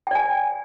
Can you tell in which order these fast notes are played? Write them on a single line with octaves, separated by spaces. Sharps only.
G5 D5 G#5